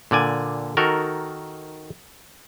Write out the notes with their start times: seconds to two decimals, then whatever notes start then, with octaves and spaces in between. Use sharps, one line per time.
0.11 A#2 D3 D5 G#5
0.77 D#3 F#4 A4 A#4